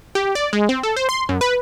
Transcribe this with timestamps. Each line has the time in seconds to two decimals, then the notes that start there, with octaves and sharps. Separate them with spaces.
0.15 G4
0.35 D5
0.53 G#3
0.69 C4
0.83 A4
0.96 C5
1.09 C6
1.29 F#2
1.41 B4